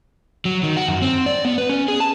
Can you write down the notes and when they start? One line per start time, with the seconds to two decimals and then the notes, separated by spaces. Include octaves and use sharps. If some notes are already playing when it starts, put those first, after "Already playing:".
0.45 F#3
0.63 D#3
0.77 F#4
0.88 F#2
1.02 C4
1.26 D5
1.45 B3
1.58 B4
1.69 C#4
1.88 G#4
2.00 A5